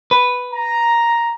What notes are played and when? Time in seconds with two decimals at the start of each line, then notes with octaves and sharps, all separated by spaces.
0.11 B4
0.52 A#5